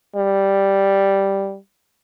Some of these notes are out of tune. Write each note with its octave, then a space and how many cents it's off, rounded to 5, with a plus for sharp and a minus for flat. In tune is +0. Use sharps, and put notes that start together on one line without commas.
G3 +0